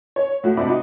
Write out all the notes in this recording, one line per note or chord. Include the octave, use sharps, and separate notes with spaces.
C#5
A2 F#4
G#2 C3 D4 C5 B5 D6
D#4 F#4